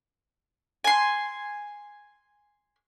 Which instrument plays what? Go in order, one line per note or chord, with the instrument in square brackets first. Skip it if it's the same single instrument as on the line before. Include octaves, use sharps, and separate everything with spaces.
[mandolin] G#5 C6